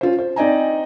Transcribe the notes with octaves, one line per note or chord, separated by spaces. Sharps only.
C#4 F4 C5
C5
C4 D#4 D5 D#5 G#5 A#5